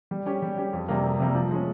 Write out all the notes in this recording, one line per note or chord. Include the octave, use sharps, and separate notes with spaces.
G3
C#4 G4
G3
C#4 G4
F2
C3 G3 A#3
F2
C3 G3 A#3
F3
G#3 C#4 G#4